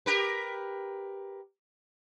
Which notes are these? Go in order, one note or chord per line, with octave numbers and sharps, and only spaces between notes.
G4 A#4 B4